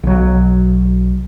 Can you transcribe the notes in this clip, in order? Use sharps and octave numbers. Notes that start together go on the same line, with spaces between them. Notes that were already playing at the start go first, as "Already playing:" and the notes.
B1 F#3